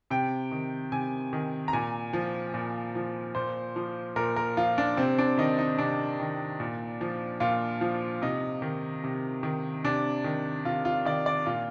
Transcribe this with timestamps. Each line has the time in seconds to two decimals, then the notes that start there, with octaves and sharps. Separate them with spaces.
0.10 C3 G5
0.52 D#3
0.92 C3 G#5
1.33 D#3
1.68 A#5
1.73 A#2 G#5
2.13 F3
2.54 A#2
2.95 F3
3.35 A#2 C5
3.76 F3
4.16 A#2 A#4
4.36 A#4
4.57 F3 F4
4.78 D4
4.97 C3 C4
5.18 D4
5.38 D#3 D#4
5.59 D#4
5.78 C3 D4
6.20 D#3
6.60 A#2
7.01 F3
7.40 A#2 F4
7.81 F3
8.22 C3 D#4
8.62 D#3
9.04 C3
9.43 D#3
9.84 C3 D4
10.24 D#3
10.65 C3 F4
10.85 F4
11.05 D#3 D5
11.26 D5
11.46 A#2 F4